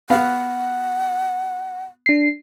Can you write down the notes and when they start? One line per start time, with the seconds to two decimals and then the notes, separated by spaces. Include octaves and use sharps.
0.10 B3 F5 F#5
2.06 D4 C7